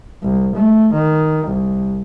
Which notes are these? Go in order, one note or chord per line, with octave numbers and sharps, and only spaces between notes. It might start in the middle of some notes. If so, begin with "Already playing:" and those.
C2
A3
D#3
C2